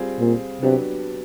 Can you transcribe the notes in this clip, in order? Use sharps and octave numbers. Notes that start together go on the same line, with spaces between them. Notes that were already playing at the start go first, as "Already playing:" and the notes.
Already playing: G3 C4 F4 G#4
A#2
C3 F#3 B3 D4 G4